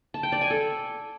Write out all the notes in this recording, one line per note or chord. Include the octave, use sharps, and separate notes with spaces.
A5
G5
D5
G#5
A4